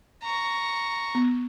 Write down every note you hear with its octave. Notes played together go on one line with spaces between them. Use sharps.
A#5 C#6
B3